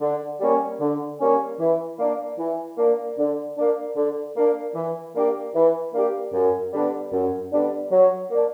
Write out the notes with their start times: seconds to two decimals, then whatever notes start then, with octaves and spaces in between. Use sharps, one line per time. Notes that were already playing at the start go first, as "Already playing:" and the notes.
0.01 D3
0.40 G3 A#3 C#4
0.80 D3
1.19 G3 A#3 C#4
1.59 E3
1.98 A#3 D4
2.38 E3
2.77 A#3 D4
3.18 D3
3.57 A#3 D4
3.96 D3
4.36 A#3 D4
4.75 E3
5.15 A#3 D4 G4
5.54 E3
5.93 A#3 D4 G4
6.33 F#2
6.73 D3 G3 B3 D4
7.12 F#2
7.52 D3 G3 B3 D4
7.91 F#3
8.30 A#3 D4